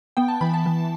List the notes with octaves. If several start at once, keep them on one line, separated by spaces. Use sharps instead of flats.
B3 G5
A5
E3 B5
A5
E3